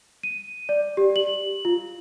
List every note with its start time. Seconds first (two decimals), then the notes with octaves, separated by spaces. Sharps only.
0.23 D#7
0.69 D5
0.97 G4
1.16 F#7
1.65 F4